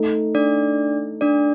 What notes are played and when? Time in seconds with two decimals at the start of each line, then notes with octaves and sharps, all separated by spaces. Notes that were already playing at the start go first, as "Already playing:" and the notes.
Already playing: A3 D#4 A4
0.35 D4 D5
1.21 D4 D5